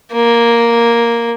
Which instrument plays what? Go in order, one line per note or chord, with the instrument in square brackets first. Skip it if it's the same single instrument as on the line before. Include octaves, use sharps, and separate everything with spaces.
[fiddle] A#3